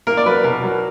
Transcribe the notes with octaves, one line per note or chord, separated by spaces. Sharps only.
A#3 A#4
D5
F#3 B4
B2 A#4
F#3